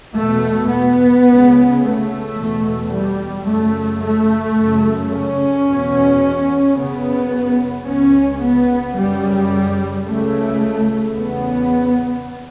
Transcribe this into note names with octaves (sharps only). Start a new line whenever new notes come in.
E2 B2 A3
B3
C#2 C#3
A3
E2 B2
G3
F#2 C#3 A3
A3
F#2 C#3
C#4
E2 B2
F#2 C#3 B3
C#2 C#3 C#4
B3
F#2 C#3 G3
C#2 C#3 A3
E2 C#3 B3